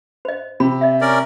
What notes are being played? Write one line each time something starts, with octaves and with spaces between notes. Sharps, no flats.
C5 D#5
C3 B5
D#5 E5
C#4 A#4 D5